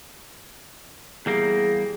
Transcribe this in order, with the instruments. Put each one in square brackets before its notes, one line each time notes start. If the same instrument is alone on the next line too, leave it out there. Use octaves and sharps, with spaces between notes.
[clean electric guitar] E2 G3 A#3 [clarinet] G#4